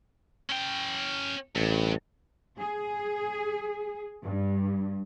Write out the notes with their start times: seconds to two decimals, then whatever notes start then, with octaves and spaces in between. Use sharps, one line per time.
0.50 C#4 G5
1.56 A1 G2
2.59 G#4
4.23 G2